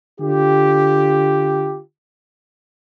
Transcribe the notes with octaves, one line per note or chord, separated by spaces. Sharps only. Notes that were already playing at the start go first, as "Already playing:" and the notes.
D3 F4 G4